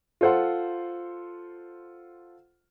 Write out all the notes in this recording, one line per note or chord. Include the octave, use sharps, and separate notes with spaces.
F4 A4 C5 F#5 C6